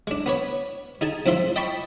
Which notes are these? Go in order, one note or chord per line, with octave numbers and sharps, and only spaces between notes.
G#3 D4
B3 B4 C#5
D#4 G#4 G#5 A5
F2 G#2 F3 E5 C6
D#5 G5 A5 B5 C#6